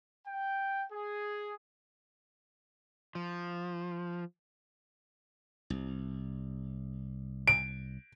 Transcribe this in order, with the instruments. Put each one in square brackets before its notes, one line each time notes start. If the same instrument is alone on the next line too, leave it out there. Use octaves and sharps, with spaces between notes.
[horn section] G5
G#4
[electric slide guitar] F3
[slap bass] C2
[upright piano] D7